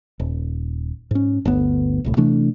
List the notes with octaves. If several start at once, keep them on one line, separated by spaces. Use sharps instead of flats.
D#1
G#2 C#4
G1 D2 B3
D#1 C2 A2
C3 E3 A3 D4